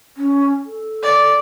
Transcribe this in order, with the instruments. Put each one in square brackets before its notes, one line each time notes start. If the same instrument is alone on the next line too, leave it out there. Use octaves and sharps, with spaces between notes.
[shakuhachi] C#4
A4
[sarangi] D5